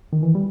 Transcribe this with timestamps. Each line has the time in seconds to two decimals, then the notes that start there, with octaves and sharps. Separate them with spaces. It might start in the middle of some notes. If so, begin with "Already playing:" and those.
0.13 D#3
0.23 E3
0.35 G3